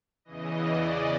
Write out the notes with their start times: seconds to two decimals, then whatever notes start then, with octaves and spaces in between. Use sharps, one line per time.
0.25 E2 C#3 E3 D#5
0.66 D5